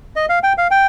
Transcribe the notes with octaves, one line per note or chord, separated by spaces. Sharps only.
D#5
F5
G5
F5
G5